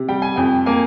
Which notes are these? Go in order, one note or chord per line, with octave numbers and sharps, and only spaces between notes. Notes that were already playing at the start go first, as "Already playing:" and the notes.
Already playing: C3
G3 G5
G#5
F2 G5
A#3 G#5